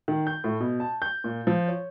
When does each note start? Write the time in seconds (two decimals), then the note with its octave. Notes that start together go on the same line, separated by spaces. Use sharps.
0.08 D#3
0.27 G6
0.44 A2
0.60 B2
0.80 A5
1.02 G6
1.24 A#2
1.47 F3
1.68 C#5